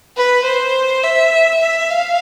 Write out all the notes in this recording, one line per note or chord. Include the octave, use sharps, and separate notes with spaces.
B4
C5
E5
E5
F5